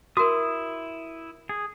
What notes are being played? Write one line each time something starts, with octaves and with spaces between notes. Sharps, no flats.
E4 F#4 A#4 D#6
G#4